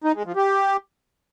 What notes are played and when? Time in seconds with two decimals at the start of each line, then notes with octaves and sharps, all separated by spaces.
0.04 D#4
0.15 G#3
0.26 F3
0.36 G4